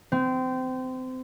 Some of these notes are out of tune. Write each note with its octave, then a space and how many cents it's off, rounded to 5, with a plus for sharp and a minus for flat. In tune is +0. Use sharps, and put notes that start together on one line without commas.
C4 -25